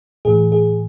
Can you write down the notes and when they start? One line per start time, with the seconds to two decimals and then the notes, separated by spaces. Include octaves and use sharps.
0.25 A2 E3 G#4
0.52 G#4